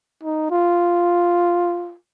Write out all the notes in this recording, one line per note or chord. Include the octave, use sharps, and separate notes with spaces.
D#4
F4